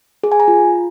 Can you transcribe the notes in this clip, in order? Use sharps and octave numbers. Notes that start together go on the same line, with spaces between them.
G#4
G#5
A#5
F4